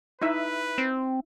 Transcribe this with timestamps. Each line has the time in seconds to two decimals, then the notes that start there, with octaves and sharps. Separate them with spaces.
0.22 D#4 E4 B4 E5
0.78 C4